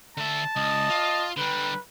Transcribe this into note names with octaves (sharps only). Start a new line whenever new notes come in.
D3 E5 A5
C#2 D#5
F4
D3 G3 B4